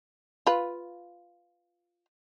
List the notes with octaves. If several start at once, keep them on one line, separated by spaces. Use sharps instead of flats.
F4 B4